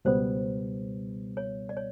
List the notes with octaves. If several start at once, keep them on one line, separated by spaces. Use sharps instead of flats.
C#2 B2 G3 B3 C5
C#5
D5
C#5